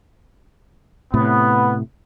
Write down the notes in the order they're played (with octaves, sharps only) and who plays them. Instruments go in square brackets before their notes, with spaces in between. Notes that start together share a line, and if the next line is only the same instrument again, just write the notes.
[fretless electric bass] A2 C3 [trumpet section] B3